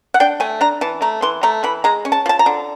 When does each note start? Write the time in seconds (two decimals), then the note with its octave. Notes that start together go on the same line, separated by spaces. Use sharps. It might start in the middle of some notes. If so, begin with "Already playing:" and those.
0.14 F#5
0.20 D4 G5
0.40 A3 G#5
0.61 D4 A#5
0.81 E3 A5
1.02 A3 A#5
1.22 E3 C6
1.43 A3 A#5
1.64 E3 B5
1.84 G#3 A#5
2.05 C#4
2.12 A5
2.26 F3 A5
2.39 A#5
2.46 D3